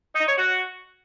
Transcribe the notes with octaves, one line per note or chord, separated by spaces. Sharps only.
D#4
C#5
F#4